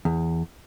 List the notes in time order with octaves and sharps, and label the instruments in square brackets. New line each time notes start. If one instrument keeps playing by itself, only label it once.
[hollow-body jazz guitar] E2